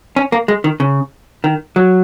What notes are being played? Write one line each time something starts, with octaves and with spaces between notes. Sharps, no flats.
C#4
A#3
G#3
D#3
C#3
D#3
F#3